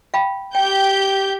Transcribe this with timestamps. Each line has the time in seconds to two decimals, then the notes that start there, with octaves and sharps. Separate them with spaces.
0.14 F5 G5 B5
0.55 G4 G5 G6